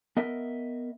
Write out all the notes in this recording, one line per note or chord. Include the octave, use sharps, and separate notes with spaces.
B3 A#4 D#5 E5